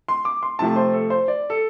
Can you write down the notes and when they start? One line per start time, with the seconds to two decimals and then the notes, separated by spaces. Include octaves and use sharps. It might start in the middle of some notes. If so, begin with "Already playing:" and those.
0.08 C6
0.25 D6
0.43 C6
0.59 C3 F3 A3 A5
0.76 C5
0.94 A4
1.10 C5
1.28 D5
1.50 A4